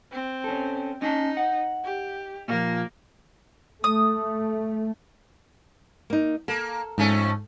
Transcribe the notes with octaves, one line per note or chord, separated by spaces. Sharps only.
C4
C#4 A4
C#4 D#4 G#5 A5
F#5
G4
A#2 F3 A#3
A3 D#6
A#3 D#4
A#3 A4
F2 G#2 A3 C#4